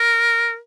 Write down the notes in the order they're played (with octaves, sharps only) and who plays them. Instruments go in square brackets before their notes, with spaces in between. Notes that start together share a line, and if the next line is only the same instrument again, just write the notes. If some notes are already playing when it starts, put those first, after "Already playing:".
Already playing: [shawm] A#4